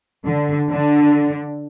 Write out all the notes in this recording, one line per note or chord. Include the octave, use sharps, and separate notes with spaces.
D3
D3